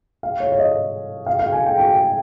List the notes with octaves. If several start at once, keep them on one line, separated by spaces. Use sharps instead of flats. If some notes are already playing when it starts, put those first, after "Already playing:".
F5
C#5
C#5
D#5
F5
F5
G#5
G5
G5